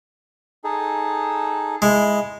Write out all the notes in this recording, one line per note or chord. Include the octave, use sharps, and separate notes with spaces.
D#4 G#4 A4
G#3 E4